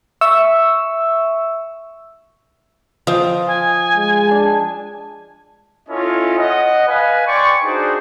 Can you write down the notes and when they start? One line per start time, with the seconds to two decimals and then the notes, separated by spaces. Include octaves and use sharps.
0.21 E5 C#6 E6
3.07 F3 D#5 F5 G5
3.47 G#5
3.96 G#3
4.27 D4 A5
5.89 C#4 E4 F4 A4 C#5 D#5
6.38 D#5 F#5
6.88 B4 F5 G#5
7.27 D5 G5 G#5 C6 C#6
7.64 D4 D#4 F#4 G#4 C5